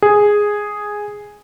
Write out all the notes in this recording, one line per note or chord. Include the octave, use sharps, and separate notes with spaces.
G#4